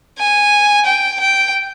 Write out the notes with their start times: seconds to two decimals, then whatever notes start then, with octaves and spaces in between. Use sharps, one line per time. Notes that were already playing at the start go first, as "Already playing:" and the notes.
0.18 G#5
0.86 G5
1.20 G5